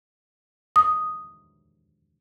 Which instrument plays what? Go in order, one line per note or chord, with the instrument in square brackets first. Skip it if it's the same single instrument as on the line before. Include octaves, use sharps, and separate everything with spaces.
[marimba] D#6